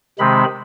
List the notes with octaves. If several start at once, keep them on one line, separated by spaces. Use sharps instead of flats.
C3 D#3 G#3 C4 B5